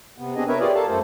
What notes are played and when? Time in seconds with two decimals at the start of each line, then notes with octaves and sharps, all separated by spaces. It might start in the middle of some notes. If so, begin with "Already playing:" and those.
0.18 C3 B3
0.36 C4 D4 G#4 D#5
0.48 A#4 B4 C#5 E5
0.60 F4 G4 G#4 C#5 D5
0.75 A4 A#4 F5 A5
0.88 F#2 A3 A4 C5